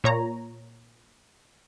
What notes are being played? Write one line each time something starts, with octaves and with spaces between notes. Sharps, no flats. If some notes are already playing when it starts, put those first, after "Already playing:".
A#2 C#5 A#5